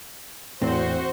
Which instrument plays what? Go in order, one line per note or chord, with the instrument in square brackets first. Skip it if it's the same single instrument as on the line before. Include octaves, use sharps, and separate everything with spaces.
[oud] E2 [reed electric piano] A2 [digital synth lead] C4 [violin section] F#4 C5